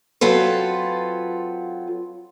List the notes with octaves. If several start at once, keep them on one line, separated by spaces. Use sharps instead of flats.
F#3 C4 F4 A4 B4